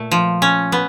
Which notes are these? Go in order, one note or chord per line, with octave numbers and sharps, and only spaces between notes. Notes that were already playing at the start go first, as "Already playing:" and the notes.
Already playing: A#2 A3
F3
C#4
B3